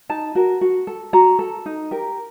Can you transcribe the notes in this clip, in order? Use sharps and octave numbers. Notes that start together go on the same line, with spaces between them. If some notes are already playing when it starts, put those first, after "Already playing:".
D#4 A5
F#4 A#4
F#4
A4
F#4 A#5
A4
D#4
G4 A#4